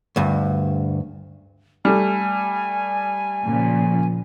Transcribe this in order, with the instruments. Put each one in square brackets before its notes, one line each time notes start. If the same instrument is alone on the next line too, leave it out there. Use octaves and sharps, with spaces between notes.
[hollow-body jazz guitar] D2 G2
[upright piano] G3 A3 [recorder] G#5
[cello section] A#2 C#3 F3